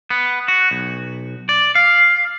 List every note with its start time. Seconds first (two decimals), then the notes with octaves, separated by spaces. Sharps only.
0.10 B3
0.48 F#4
0.71 B1
1.49 D5
1.75 F5